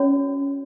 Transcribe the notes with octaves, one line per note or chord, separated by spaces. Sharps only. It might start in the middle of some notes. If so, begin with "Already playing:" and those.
Already playing: C#4 F#4 C#5